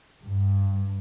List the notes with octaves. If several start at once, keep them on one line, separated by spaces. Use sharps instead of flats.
G2